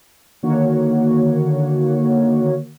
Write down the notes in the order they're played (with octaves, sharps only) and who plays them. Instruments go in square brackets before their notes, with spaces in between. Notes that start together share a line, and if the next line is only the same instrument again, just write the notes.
[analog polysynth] D3 D#3 A#3 F#4 C#5